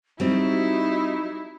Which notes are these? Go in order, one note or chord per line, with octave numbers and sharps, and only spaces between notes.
G3 C4 D#4 E4 F#4